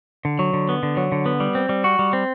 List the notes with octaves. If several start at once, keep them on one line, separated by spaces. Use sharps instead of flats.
D3
F#3
D3
B3
D3
F#3
D3
B3
G3
C4
G3
F#4
G3
C4